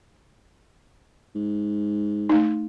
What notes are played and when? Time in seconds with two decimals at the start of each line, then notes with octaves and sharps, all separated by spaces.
1.35 G#2
2.29 A3 D#4